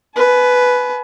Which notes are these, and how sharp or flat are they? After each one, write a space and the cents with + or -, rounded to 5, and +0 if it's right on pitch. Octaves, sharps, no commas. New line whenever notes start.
B4 +5 G#5 +45